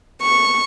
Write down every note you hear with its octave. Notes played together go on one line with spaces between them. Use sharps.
C#6